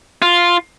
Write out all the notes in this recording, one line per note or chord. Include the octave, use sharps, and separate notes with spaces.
F4